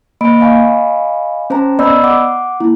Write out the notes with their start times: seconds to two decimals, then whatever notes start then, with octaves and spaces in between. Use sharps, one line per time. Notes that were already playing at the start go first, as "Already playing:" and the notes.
0.21 A#3 D#5 B5 D7
0.40 D#5 F5 G#5 B5 C#6
1.50 C#4 C5 A5 A#5
1.79 B3 D5 D#5 B5 E6 G6
2.04 F#5 D6
2.60 A#3 E4